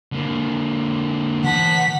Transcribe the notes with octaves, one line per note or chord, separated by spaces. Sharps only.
D3 A#3
E3 F#5 A5 B6